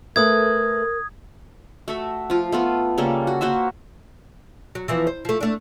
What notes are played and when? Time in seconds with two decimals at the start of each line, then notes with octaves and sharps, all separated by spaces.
0.16 A3 A#4 B4 E5 D#6 G#6
1.88 A3 F#4 E5
2.30 F3 F4
2.52 A3 B3 F4
2.98 C#3 G3 A#3 A4
3.27 F#4
3.41 A#3 F#4 C5 E5
4.75 F#3
4.88 E3 F3 B3
5.07 C5
5.25 F3 A3
5.41 A3 D4